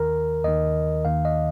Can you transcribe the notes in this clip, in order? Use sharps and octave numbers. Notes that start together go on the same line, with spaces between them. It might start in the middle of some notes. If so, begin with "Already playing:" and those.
Already playing: D#2 D#3 A#4
D#2 D#3 D#5
D#2 D#3 F5
D#5